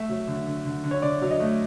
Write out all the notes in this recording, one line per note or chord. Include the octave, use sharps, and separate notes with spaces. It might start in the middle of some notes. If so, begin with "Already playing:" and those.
Already playing: A3 E5
F#3
D3
D3
D3
D3
C#5
D3 D5
F#3
D#5
A3